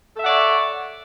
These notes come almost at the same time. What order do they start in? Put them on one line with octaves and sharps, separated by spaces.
A4 E5 F#5 D5 C#5